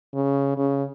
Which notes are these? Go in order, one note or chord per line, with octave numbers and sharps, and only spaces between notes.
C#3
C#3